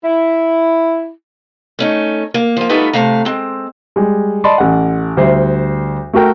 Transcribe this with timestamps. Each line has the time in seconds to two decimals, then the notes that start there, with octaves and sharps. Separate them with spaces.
0.05 E4
1.79 A3 C#4 D#4
2.34 A#3
2.57 F3 A#3
2.69 G3 A3 B3 D#4 F4 B4
2.93 A2 C3 A3 F5 A#5
3.25 G#3 C4
3.96 G3 G#3
4.44 D5 D#5 A5 B5 C6
4.58 A1 F#5
5.17 D2 G3 C5 E5
6.13 A3 F#4 A#4 G5